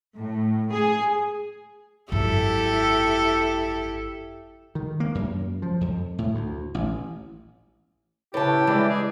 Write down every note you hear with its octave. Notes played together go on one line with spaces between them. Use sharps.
A2
G#4
G#1 F#2 E4 G4 A4
D#3
A#3
F#2
F3
F2
A2
D2
A1
A2 C#3 E4 G4 B4 C#5 A5
E3 G3 G#3 D4 B4 D5
G#4